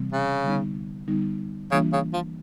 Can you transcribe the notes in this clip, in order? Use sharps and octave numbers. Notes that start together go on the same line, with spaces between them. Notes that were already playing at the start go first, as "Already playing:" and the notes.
Already playing: C3 E3 G3 C4
C#3
D3 G3 B3 D#4
D3 G3 B3 D#4
C#3 E3 G3 A#3 D4 F4
C#3
F3